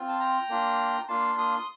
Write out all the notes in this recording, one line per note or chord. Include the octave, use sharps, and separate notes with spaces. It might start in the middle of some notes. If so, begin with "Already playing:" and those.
Already playing: C4 F4
A5
G5 A#5
A#3 D4 F4
A#3 D4 F4 A5 C6
C6 D#6
D#6